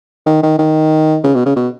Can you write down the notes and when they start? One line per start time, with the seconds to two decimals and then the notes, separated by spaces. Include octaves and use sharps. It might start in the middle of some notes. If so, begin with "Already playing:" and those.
0.26 D#3
0.43 D#3
0.59 D#3
1.24 C#3
1.35 B2
1.46 C#3
1.56 B2